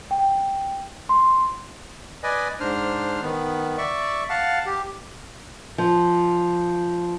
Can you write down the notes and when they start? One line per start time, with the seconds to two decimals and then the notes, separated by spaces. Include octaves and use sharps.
0.11 G5
1.09 C6
2.23 B4 D5 D#5 G#5
2.60 G#2 D4 C5 F6
3.23 D#3 B3
3.78 D5 E5 C#6
4.30 F5 F#5 A5
4.66 G4
5.78 F3